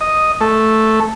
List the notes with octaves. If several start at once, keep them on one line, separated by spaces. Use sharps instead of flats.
D#5
A3